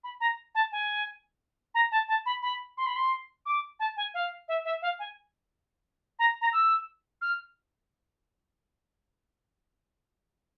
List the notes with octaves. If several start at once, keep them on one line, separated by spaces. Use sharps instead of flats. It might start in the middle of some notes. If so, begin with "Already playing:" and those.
B5
A#5
A5
G#5
A#5
A5
A5
B5
B5
C6
B5
C6
D6
A5
G#5
F5
E5
E5
F5
G#5
A#5
A#5
E6
F6